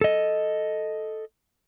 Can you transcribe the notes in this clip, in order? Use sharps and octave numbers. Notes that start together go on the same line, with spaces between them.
A4 D#5